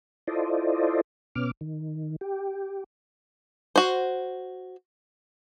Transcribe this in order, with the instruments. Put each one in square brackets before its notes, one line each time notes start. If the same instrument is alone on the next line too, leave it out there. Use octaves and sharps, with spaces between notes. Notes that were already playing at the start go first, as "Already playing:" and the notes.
[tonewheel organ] E4 F4 A4 C5 D5 D#5
B2 B3 C#4 D6 F6
D#3
G4
[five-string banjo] F#4 C5